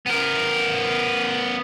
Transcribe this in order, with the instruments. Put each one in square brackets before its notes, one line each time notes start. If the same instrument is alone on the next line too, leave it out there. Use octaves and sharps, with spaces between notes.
[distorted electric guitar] B3 A#4